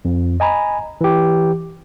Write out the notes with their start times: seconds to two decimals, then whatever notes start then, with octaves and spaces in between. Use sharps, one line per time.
0.05 F2
0.40 D#5 G#5 A#5 B5
1.01 E3 G4